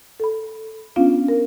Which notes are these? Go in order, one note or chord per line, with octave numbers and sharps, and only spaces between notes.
A4 B5
B3 C#4 D4 F4 F5
A#4